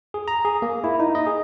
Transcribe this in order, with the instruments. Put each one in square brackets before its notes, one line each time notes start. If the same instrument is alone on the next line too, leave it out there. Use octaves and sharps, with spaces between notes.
[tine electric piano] G#4
A#5
G#4
A#3
E4
D#4
D#5
G#4